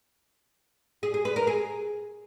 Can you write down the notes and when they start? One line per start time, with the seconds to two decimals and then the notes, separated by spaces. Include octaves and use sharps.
1.03 G#4
1.14 G#4
1.25 B4
1.36 A#4
1.47 G#4